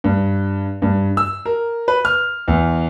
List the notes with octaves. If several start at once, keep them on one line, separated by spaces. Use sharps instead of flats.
G2
G2
E6
A#4
B4
F6
E2